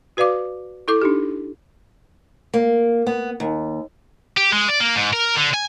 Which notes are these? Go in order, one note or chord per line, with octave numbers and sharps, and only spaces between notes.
F#4 B4 D5 F5 D6
E4 A4 D6
D4 D#4 G4
A#3
B3
D#2
G4
G#3
D5
A#3
G#2
A#4
D3
G#5